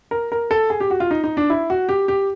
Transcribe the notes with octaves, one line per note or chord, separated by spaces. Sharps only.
A#4
A#4
A4
G#4
G4
F#4
F4
D#4
D#4
D4
E4
F#4
G4
G4